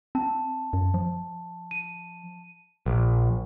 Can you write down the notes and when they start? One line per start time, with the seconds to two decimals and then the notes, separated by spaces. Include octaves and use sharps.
0.15 C4 A5
0.73 F#2
0.94 F3
1.71 D#7
2.86 A#1